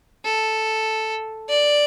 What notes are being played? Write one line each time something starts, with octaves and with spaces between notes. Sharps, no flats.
A4
D5